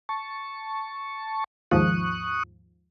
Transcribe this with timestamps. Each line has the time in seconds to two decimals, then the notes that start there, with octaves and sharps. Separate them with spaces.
0.09 A5 C#6
1.71 D#2 G#2 F3 C#6 D#6 F#6